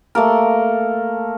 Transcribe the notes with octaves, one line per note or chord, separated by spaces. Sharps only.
A3 A#3 A#4